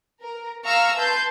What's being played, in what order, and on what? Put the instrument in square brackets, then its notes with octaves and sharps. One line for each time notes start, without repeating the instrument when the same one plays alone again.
[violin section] A#4
F5 A#5 C#6 E6 F6
B4 A5 C6 G6